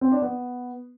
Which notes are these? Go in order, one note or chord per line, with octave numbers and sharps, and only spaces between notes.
C4
D4
B3